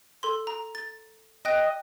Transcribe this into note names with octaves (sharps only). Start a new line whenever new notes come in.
A4 C6
A#5
A6
D#5 G5 F#6 A#6